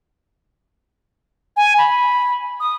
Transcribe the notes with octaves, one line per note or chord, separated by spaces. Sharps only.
G#5
B5
D#6